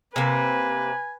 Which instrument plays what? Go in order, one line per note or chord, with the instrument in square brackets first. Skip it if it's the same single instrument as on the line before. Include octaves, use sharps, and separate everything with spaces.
[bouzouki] C3 A#3 [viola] B4 [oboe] G#5